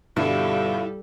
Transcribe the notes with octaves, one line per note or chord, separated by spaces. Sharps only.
G2 B2 D3 G3 E4 F4 A4